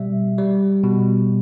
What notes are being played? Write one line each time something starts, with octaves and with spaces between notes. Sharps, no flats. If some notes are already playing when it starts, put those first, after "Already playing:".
Already playing: B2 G3 E5
G3
B2